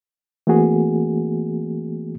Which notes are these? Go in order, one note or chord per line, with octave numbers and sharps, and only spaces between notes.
E3 A3 A#3 C4 F#4 G#4